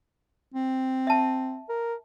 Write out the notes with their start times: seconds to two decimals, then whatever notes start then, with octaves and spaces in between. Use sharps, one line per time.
0.54 C4
1.07 E5 A5
1.69 A#4